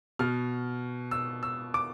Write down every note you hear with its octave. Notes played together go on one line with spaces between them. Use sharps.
B2 F6
E6
E6
D6